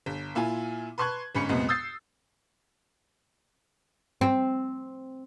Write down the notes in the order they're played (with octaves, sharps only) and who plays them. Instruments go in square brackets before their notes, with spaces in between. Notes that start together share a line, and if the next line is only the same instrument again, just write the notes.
[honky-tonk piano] G1
A#2 E4 F4 G#5
B4 A5 C6 C#6 F#6 G#6
G1 G#2 C#4 B5 C#7
C2 F2 A#2 G#3 B3
D#6 E6 G6 A6 C7
[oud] C4